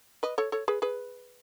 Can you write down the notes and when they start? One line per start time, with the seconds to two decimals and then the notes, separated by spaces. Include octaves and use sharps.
0.23 B4 D#5
0.38 A4 C#5
0.52 A4 C#5
0.68 G#4 B4
0.82 G#4 B4